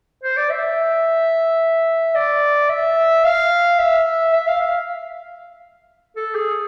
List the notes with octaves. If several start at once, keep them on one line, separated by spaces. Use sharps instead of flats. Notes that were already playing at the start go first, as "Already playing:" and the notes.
C5
D5
E5
D5
E5
F5
E5
E5
F5
F5
A4
G#4